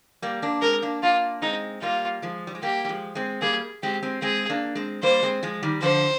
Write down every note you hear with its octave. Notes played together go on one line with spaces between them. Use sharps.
G3 A#3
A#3 D4
G#3 C4 A#4
A#3 D4
A#3 D4 F4
G#3 C4 D#4
G3 A#3 F4
F3 G#3
G3
G#3
G3 A#3 G4
G3
F3 G#3
G#3 C4
G3 A#3 G#4
G#3 C4 G4
G#3 C4
G#3 C4 G#4
A#3 D4
G#3 C4
G3 A#3 C5
G#3 C4
F3 G#3
D#3 G3
D3 F3 C5